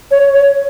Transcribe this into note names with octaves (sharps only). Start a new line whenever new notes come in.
C#5
C#5